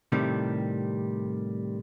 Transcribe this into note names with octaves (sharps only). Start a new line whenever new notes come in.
A2 C3 D#3 G3